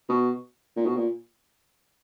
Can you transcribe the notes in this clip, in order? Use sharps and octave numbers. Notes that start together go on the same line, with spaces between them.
B2
A#2
B2
A#2